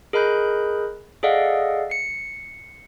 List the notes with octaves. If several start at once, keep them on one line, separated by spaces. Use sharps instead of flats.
G#4 A#4 D#5 B5 F#6 G6
G#4 A4 D5 D#5 F5 F#5
C7 C#7